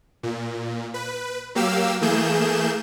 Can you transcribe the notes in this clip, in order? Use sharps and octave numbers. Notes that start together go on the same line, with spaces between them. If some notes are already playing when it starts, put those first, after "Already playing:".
A#2
B4
F#3 A#3 G4 F5 E6
E3 A3 A#3 G#4 G6 E7